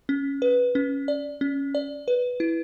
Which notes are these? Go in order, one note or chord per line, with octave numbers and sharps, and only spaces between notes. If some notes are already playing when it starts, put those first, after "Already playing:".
C#4
B4
C#4
D5
C#4
D5
B4
E4